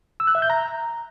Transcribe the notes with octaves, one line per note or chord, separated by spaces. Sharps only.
E6
F#6
E5
G6
A#5